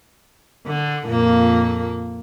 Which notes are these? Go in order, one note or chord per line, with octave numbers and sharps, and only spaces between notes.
D3
F2 A#2 A#3